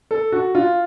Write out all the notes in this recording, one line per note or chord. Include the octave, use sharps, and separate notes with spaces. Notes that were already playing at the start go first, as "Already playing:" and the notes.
A4
F#4
F4